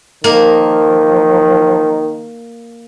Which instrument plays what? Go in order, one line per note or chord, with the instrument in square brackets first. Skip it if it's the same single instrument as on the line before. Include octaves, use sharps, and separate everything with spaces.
[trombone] D#3 [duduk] F3 [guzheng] A#3